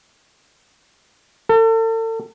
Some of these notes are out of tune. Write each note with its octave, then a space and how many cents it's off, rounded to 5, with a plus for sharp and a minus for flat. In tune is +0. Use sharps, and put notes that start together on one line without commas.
A4 +40